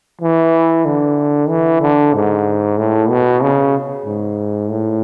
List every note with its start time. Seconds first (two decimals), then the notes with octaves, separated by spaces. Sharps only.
0.21 E3
0.85 D3
1.49 E3
1.81 D3
2.14 G#2
2.78 A2
3.09 B2
3.42 C#3
4.06 G#2
4.70 A2